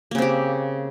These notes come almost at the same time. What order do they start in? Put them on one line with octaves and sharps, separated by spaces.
A#3 C#3 C4 G4